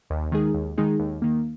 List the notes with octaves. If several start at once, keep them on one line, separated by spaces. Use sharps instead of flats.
D#2
D#3 G#3 D#4 G#4
D#2
D#3 G#3 D#4 G#4
D#2
D#3 A#3